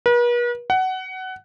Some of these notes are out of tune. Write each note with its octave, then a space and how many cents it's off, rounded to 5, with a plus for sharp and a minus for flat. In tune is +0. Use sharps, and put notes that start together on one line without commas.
B4 -45
F#5 +20